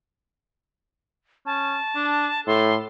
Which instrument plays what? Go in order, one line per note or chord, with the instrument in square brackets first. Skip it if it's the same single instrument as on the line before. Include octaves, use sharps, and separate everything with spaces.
[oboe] C#4 [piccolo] A5
[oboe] D4
[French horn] A2 [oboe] A4 [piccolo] C6